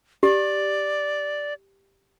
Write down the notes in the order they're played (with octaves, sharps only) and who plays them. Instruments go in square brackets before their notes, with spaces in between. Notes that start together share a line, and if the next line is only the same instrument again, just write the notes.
[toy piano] G4 [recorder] D5